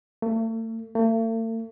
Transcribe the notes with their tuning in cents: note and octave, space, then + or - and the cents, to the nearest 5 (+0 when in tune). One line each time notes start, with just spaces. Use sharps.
A3 +40
A3 +45